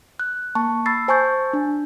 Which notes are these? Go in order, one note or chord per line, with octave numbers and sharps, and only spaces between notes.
F#6
A#3 A5 C#6
B5 E6 A6 C7
C5 G#5 A5 C#6 G6 A6
D4